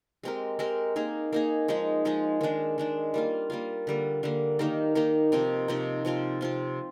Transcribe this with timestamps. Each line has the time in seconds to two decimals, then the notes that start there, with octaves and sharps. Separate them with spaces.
0.23 G#3 C4 G4 A#4
0.59 G#3 C4 G4 A#4
0.96 A#3 D#4 G#4
1.33 A#3 D#4 G#4
1.68 F3 G#3 D#4 G#4
2.05 F3 G#3 D#4 G#4
2.41 D#3 G#3 D4
2.78 D#3 G#3 D4
3.14 G3 A#3 F4
3.50 G3 A#3 F4
3.87 D3 G3 A#3
4.23 D3 G3 A#3
4.59 D#3 A#3 D#4 G4
4.95 D#3 A#3 D#4 G4
5.32 C3 F3 C4 D#4
5.68 C3 F3 C4 D#4
6.05 C3 F3 C4 F4
6.41 C3 F3 C4 F4